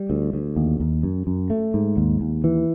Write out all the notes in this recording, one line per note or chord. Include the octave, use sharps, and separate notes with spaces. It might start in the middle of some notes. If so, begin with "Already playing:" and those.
Already playing: G3
D2
D2
D#2
D#2
F#2
F#2
A3
G#2
D#2
D#2
E3